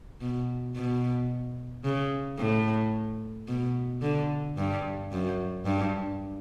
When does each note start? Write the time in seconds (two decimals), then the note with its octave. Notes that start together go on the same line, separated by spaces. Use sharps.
0.21 B2
0.76 B2
1.84 C#3
2.39 A2
3.48 B2
4.02 D3
4.57 G2
5.12 F#2
5.66 G2